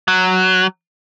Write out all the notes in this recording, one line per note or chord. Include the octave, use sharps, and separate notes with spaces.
F#3